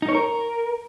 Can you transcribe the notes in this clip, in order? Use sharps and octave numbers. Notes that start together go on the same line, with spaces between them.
D#4
C#5
A#4